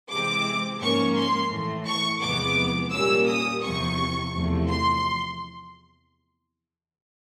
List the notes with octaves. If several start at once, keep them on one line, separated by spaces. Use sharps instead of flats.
C3 E3 G#3 C4 D6
G#2 F3 A#3 C#4 C#6
C6
A2 E3 A3
C#6
E2 C3 F3 G#3 B3 D6
A#2 G3 A#3 C#4 E6
D#6
E2 C3 F3 C#6
E2 C3 F3 A3
C6